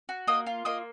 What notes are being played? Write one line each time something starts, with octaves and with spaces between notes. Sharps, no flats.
F#4
A#3 D#5 D#6
F4
A#3 D#5 D#6